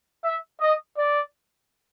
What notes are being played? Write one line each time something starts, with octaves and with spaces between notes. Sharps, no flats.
E5
D#5
D5